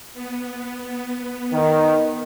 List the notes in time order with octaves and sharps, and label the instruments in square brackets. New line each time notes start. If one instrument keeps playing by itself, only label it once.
[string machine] B3
[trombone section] D#3